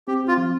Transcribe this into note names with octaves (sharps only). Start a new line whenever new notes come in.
C4 G4
F4
F3